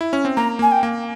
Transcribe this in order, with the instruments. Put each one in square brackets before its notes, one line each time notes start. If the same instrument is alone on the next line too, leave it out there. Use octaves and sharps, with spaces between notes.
[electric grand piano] E4
C#4
C4
[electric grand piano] A#3 [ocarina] A#5
[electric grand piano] A#3 [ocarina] G#5
[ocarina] G5
[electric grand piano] A#3